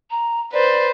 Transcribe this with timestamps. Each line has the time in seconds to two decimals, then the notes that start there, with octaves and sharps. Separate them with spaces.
0.11 A#5
0.53 B4 C5 D5